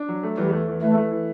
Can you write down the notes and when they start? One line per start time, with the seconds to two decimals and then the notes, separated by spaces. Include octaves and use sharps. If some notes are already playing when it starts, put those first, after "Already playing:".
Already playing: D4
0.09 F#3
0.23 A3
0.37 E2 G3
0.53 A3
0.68 E2
0.82 E3 A3
0.97 A3
1.11 E3